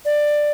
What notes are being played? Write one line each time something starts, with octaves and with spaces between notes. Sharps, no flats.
D5